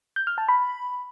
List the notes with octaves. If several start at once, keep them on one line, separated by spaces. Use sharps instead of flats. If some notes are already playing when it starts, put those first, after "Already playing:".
G6
F6
A5
B5